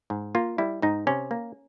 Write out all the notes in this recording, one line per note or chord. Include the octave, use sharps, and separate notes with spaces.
G#2
A#3 F4
G3 E4
G#2 D#4
C3 C#4
A#3